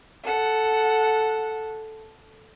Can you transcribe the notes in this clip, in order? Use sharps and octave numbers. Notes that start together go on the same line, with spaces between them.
A4 F#5